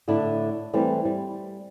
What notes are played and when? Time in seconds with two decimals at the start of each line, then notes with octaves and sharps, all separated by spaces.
0.08 A2 D3 A3 D4 E4
0.73 E3 G3 A3 C4 G4
1.05 G3